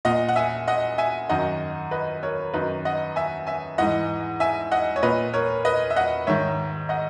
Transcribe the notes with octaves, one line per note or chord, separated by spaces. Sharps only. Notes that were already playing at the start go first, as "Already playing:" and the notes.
A#2 D#5 F#5
F#5
E5 G#5
D#5 F#5
E5 G#5
F#2 D#3 D#5 F#5
B4 D#5
A#4 C#5
F#2 D#3 B4 D#5
D#5 F#5
E5 G#5
E5 G#5
G#2 E3 D#5 F#5
E5 G#5
D#5 F#5
C#5
A#2 B4 D#5
A#4 C#5
B4 D#5
E5
D#5 F#5
G#2 D#3 C#5 E5
D#5 F#5